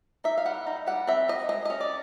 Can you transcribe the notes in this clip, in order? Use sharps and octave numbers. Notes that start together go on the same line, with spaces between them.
D#4 E5
F5
G3 F#5
D#4
G3 F#5
C4 E5
C4 D#5
G#3 D#5
C#4 D#5
D5